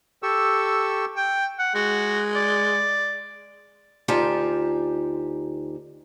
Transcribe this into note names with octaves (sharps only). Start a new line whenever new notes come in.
G4 A4 C#6 E6
G5
F#5
G#3 F#4
D5
D2 D#4 F4 G4 G#5 A5